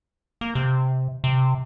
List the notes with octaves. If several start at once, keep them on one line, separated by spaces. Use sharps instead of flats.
A#3
C3
C3